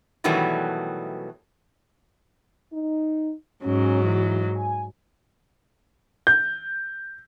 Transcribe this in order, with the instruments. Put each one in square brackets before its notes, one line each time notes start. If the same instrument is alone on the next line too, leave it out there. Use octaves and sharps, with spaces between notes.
[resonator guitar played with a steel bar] B2 D#3 E3 F#3 G3 A3
[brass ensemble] D#4
[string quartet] G#2 F#3 [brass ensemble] C#4
[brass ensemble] E3
G#5
[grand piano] G6